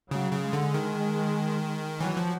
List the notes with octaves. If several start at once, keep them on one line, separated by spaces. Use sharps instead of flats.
C#3 F#3
C#3
G#3
D3
D#3
E3 F#3
F3